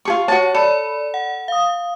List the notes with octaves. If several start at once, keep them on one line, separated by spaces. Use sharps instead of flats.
F4 G#4 C#6
F#4 C#5 A5
A4 D5 B5
F#5
F5 D#6